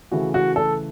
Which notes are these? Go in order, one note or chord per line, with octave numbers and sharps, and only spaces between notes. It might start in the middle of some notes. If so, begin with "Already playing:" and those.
C#3 E3 A3 F#4
F#4
A4